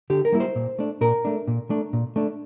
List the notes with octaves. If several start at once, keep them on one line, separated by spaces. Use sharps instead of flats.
D3 G4
A#4
G3 A#3 E4
C5
A#2
A3 D4
A#2 A#4
A3 D4
A#2
A3 D4
A#2
A3 D4